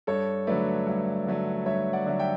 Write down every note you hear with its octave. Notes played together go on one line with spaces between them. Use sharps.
G2 A4 C#5
D3 F#3 A3 B4 D5
G2
D3 F#3 A3
G2 C#5 E5
D5 F#5
D3 F#3 A3
E5 G5